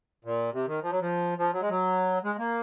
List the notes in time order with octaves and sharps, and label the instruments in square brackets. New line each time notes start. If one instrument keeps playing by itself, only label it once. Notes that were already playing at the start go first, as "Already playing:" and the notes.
[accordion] A#2
C3
D#3
F3
F#3
F3
F3
F#3
G#3
F#3
G#3
A#3